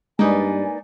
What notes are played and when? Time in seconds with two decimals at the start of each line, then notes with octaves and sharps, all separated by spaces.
0.19 G2 G#3 A#3 D#4 B4 D5 G#5